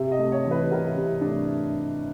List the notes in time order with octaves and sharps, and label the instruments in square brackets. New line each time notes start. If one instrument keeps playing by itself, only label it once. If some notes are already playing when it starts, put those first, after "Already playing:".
Already playing: [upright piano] C3 E5
D#5
A3
C#5
E3
B4
C3 A#4
C3
A3 D4